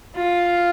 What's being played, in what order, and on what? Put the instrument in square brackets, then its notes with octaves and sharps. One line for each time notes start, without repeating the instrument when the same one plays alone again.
[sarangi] F4